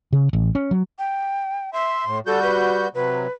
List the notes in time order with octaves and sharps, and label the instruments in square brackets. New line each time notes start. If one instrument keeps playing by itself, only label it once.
[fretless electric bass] C#3
A1
C#4
F#3
[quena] G5
[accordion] E5 [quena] C6
[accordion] A2
[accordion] G3 F#4 G6 [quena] A4
[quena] B4
[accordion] C3 F#3 [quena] B4